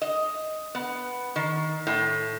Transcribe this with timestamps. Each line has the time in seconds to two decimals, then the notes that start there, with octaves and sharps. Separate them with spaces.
0.02 D#5
0.75 B3
1.36 D#3
1.87 A2